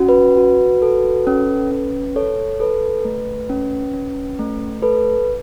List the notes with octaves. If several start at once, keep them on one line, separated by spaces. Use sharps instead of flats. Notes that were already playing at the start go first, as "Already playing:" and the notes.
Already playing: C#4 F#4
B4
F#4
A4
C#4
C#4
A4 C#5
A4 B4
A3
C#4
C#4
A3
A4 B4